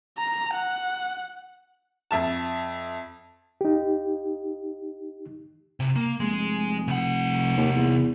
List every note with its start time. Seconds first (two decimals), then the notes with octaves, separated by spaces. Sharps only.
0.18 A#5
0.55 F#5
2.11 F2 E5 A5
3.61 D#4 G4
5.80 C3
5.96 A#3
6.20 F1 G#3
6.88 C2 F#5
7.57 D#2
7.76 E2